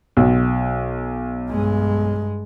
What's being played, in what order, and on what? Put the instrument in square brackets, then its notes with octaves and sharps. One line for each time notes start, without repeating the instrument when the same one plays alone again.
[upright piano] B1
[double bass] G2 G#3